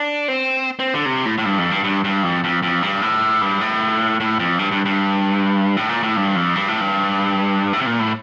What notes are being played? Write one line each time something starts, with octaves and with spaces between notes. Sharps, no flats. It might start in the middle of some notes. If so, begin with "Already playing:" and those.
Already playing: D4
C4
C4
D3
C3
A2
A2
G2
F2
G2
G2
G2
F2
F2
F2
G2
A2
G2
A2
A2
F2
G2
G2
G2
A2
A#2
A2
G2
F2
G2
A2
G2
A2
C3
A#2
A2